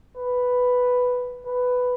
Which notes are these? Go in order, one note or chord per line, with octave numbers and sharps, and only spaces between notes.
B4
B4